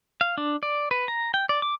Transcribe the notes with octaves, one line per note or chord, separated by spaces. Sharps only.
F5
D4
D5
B4
A#5
G5
D5
D6